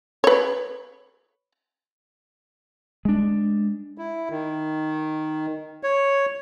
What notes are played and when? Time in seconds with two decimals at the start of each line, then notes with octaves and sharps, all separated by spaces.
0.24 B4 C#5
3.05 G#3 D4
3.98 E4
4.30 D#3
5.83 C#5